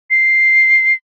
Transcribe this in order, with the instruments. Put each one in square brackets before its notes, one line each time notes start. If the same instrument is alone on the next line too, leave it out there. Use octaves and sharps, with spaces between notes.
[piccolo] C7